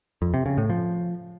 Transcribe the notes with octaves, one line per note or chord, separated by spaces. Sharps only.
F2
C3
C#3
A2
F3